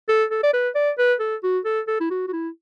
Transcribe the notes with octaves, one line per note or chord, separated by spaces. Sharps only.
A4
A4
D5
B4
D5
B4
A4
F#4
A4
A4
E4
F#4
F#4
E4